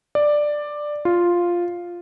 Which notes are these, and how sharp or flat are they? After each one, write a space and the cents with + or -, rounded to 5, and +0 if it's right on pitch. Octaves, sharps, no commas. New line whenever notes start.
D5 +10
F4 +0